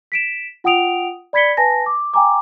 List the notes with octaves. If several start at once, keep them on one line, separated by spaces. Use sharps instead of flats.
B6 D7 E7
F4 F#5 G5 D#6 D7 F7
D5 B5 G#6 B6 C#7 G7
B4 G#5 A5 A#6
D6
G5 G#5 A#5 D6